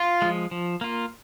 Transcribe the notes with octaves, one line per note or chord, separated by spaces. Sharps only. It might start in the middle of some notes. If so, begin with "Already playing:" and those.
Already playing: F4
F3 G#3
F3
A#3 F4